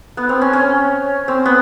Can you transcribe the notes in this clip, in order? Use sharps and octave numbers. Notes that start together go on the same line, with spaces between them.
B3
C4
C#4
C#4
C4
B3